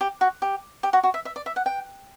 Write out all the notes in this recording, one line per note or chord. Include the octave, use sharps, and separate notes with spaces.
G4
F#4
G4
G4
F#4
F#4
E5
E5
D5
E5
F#5
G5